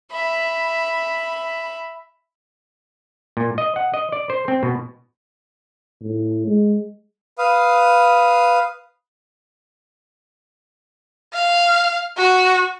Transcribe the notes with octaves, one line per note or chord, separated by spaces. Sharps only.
E5 B5
A#2
D#5
F#5
D#5
D5
C5
C4
B2
A2
G#3
B4 F5 D#6
F5
F#4